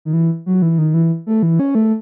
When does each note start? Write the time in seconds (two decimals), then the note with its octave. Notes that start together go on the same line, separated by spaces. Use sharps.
0.05 D#3
0.13 E3
0.46 F#3
0.62 E3
0.79 D#3
0.94 E3
1.27 A3
1.43 E3
1.60 C#4
1.75 A3